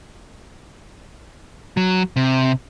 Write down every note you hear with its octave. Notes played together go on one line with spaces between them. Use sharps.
F#3
C3